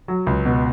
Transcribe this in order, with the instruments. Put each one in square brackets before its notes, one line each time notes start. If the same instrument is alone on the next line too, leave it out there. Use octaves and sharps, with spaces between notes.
[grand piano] F#3
C#2
B2